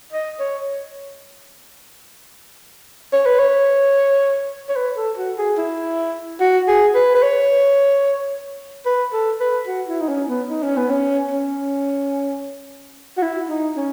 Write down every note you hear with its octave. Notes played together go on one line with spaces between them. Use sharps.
D#5
C#5
C#5
B4
C#5
C#5
B4
A4
F#4
G#4
E4
F#4
G#4
B4
B4
C#5
B4
A4
B4
F#4
E4
D#4
C#4
B3
D#4
C#4
B3
C#4
C#4
F#4
E4
D#4
C#4